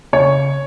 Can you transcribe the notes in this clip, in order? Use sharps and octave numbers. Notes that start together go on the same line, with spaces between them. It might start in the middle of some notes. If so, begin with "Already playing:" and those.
C#3 C#5